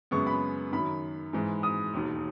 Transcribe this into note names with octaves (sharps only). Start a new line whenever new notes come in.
F#2 C#3 G#3 B3 C#6
B5
F#2 D#3 F#3 B5
G#2 E3 G#3
D#6
E1 D#2 D#3